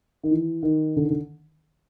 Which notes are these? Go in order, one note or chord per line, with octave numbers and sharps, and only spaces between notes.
D#3
E3
D#3
D3
D#3
D3